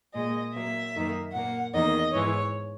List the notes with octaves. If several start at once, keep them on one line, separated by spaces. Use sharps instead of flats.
A#2 G#3 D#5
A#2 F#3 A#3 E5
F#2 D#3 A#3
A#2 A#3 F#5
E2 D#3 A#3 D#5
G#2 E3 G#3 C#5